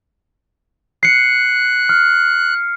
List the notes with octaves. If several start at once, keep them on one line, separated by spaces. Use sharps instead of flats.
F#6 C7 C#7
F6